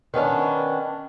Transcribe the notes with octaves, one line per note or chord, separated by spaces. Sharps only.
D#3 B3 C#4 D4